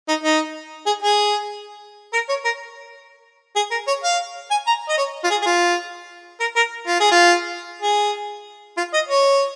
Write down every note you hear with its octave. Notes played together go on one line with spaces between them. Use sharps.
D#4
D#4
G#4
G#4
A#4
C#5
A#4
G#4
A#4
C#5
F5
G#5
A#5
D#5
C#5
F4
G#4
G#4
F4
A#4
A#4
F4
G#4
F4
G#4
F4
D#5
C#5